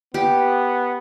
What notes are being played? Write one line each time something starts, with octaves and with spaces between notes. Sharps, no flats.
B3 G4